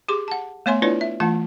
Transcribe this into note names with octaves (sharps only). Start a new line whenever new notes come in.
G4 G#4 C6 D6
F#5 A5
A3 B3 C#5 E5 G#5 C6
D4 E4 F4 B4 C#5 D5
E5
E3 A3 F4 F#5 A5